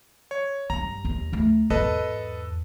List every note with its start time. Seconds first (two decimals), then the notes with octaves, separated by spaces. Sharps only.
0.31 C#5
0.70 G2 D3 A#5
1.05 D#2
1.32 D2 A3
1.70 E2 G#2 A4 B4 D#5